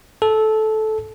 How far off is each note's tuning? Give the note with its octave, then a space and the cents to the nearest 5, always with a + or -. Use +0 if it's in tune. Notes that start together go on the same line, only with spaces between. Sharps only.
A4 -15